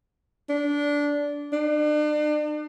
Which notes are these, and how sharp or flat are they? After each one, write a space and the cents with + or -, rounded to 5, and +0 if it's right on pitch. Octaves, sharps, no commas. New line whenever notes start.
D4 -15
D4 +40